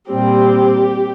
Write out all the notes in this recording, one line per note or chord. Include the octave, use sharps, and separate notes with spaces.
A#2 G3 C4 G4